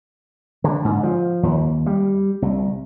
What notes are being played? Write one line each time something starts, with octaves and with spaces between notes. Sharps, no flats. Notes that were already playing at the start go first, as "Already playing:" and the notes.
D3
G#2
F3
D#2
G3
C2